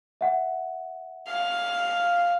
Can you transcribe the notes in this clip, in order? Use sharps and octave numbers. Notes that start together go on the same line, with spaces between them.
E5 F#5
F5